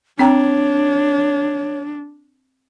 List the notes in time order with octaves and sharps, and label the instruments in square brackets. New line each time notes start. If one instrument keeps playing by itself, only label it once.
[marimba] C4 G5 A#5 [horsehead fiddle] D4 [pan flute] C#5